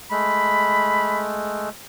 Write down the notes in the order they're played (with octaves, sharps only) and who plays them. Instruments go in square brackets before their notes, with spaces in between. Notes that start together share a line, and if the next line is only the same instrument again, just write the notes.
[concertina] G#3 A3 [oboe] B5